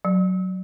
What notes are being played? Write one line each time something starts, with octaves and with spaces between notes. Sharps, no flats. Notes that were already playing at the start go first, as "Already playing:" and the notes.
F#3